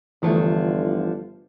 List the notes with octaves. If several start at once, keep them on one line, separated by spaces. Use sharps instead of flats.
G1 D3 E3 F3 A3